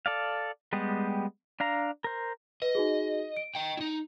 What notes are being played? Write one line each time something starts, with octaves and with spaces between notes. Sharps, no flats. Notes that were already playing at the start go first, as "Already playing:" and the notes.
A4 D5 F5
G3 G#3 B3 G4
D4 F5 A#5
A#4 C5
B4 D#5
D#4 F#4 G#4
D7
D#5 G5
D#4 E4